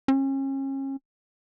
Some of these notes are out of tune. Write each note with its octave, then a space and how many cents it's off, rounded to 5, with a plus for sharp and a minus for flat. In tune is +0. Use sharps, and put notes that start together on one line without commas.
C#4 -35